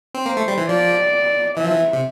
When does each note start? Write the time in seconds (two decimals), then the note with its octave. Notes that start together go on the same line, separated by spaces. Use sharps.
0.15 C4
0.25 A#3 C5
0.37 A3
0.48 G3
0.58 E3
0.69 F3 D5
1.57 E3 E5
1.64 F3
1.71 E3
1.93 C3